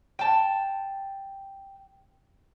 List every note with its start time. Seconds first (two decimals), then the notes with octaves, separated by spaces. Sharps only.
0.19 G5 A5